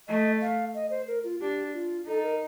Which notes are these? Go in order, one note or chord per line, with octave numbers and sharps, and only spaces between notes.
A3 D#5
F5
D#5
C5
A#4
F4
D4 G4
F4
D#4 A4
A#4